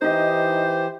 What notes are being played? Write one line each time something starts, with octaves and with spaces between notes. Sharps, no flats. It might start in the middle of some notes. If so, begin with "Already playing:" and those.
E3 D#4 G4 C5 D#5